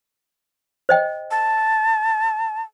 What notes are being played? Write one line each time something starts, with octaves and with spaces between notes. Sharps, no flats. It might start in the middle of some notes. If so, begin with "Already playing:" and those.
C5 D#5 G5
A5